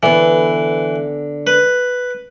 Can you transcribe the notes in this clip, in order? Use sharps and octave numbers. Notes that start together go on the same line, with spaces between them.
D3 E3 B3
B4